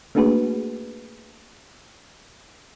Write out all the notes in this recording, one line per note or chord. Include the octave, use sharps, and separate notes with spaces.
A3 A#3 D4 F#4 G#4 B4